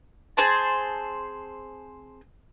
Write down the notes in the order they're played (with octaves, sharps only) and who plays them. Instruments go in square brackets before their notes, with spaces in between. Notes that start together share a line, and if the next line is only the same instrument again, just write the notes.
[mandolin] C4 G#4 C5 A5